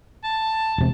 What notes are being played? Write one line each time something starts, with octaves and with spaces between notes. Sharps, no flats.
A5
E1 C3